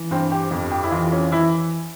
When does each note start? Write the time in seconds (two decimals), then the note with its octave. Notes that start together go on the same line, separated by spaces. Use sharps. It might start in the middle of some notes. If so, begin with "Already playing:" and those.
Already playing: E3
0.11 G2 C4
0.32 G4
0.51 F2
0.71 G4
0.84 E4
0.91 E3 F4
1.12 C#4
1.32 E3 E4